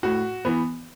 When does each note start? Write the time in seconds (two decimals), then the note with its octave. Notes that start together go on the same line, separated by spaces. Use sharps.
0.03 A2 F#4
0.45 E3 B3